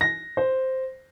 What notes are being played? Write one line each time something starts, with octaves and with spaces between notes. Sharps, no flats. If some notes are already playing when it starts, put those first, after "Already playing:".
A#6
C5